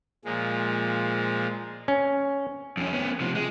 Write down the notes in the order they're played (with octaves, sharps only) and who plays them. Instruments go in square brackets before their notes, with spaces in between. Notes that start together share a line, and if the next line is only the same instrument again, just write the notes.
[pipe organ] A#2 F3 G#3
[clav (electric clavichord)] C#4
[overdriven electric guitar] F2 C#4
B3 C#4
C3 F3
G#3